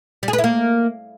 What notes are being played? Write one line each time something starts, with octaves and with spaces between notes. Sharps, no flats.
G3
G#4
B4
E4
A#3